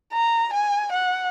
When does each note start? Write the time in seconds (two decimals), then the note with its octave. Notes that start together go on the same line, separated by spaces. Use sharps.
0.13 A#5
0.53 G#5
0.92 F#5